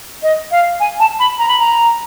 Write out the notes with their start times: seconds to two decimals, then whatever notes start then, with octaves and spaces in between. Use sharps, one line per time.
0.23 D#5
0.51 F5
0.80 G#5
1.00 A5
1.19 B5
1.39 A#5
1.48 B5
1.60 A#5